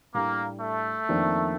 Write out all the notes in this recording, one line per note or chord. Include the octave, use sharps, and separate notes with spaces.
A2 G3 A#3 D4
A3
F2 D#3 A#3 D4